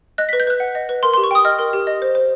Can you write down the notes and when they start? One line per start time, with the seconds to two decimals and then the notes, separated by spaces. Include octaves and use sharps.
0.18 D#5 F#6
0.29 B6
0.33 B4
0.40 G6
0.47 B4 F#6
0.60 F#5
0.75 D#5
0.89 B4
1.03 A#4 C6
1.14 C6
1.17 G4
1.24 C#6
1.31 G5 D#6
1.45 D#5 F6
1.59 A#4
1.73 G4
1.87 D#5
2.02 C5
2.15 C5